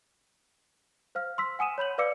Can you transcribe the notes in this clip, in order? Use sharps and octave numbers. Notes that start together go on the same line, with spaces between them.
C5 F5 F6
C6 E6 B6
F#5 G#5 D#6 D#7 E7
C#5 B5 G6 F#7
B4 D5 F5 D6 E6 C#7